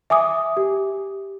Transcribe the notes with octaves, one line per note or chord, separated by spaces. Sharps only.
E5 G#5 D6 D#6
G4